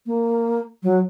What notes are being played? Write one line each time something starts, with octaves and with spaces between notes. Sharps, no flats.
A#3
F#3